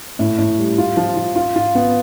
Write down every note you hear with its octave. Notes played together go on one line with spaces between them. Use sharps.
A2
A2
G3
F4
F3
F3
F4
F4
B3